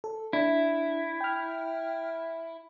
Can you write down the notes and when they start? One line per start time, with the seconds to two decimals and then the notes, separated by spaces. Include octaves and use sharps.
0.04 A4
0.33 D4 E4
1.21 G5 F6